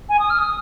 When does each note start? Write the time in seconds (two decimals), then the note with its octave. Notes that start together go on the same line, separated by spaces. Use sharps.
0.09 G#5
0.19 D#6
0.30 F6
0.39 D#6